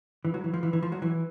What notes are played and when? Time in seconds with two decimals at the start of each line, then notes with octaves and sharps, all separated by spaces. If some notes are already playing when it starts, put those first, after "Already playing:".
0.25 E3
0.34 F#3
0.44 E3
0.54 F3
0.63 E3
0.73 E3
0.83 F3
0.92 F#3
1.02 E3